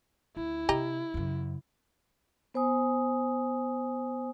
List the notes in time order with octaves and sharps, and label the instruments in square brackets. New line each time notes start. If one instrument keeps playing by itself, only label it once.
[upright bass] D2 [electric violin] E4
[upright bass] C3 [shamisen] G4 D#5 A#5
[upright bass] F#2 C#3
[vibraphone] B3 C5 G#5 D#6